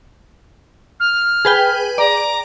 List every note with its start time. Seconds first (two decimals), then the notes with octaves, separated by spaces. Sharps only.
1.00 F6
1.45 G#4 B4 G5
1.98 D5 A#5